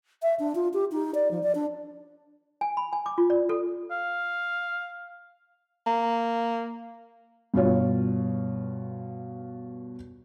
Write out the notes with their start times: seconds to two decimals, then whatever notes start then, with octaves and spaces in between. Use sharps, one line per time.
0.22 E5
0.39 D4
0.55 F4
0.74 G4
0.92 D#4
1.15 D5
1.31 F3
1.43 D5
1.55 D4
2.61 G#5
2.77 B5
2.93 G#5
3.06 D6
3.18 F4
3.30 D5
3.49 A4
3.91 F5
5.87 A#3
7.54 G2 B2 F4 C#5